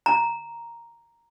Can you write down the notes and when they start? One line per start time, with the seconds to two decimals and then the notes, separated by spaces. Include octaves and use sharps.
0.06 A#5